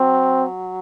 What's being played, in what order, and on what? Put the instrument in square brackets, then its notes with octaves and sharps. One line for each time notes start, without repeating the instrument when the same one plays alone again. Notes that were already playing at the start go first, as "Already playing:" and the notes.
Already playing: [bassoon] F#3 [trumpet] C4